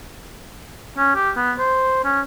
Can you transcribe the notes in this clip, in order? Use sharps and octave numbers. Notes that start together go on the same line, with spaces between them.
C#4
G4
B3
C5
C#4